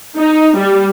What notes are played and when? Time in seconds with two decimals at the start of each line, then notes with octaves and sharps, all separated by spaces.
0.19 D#4
0.58 G3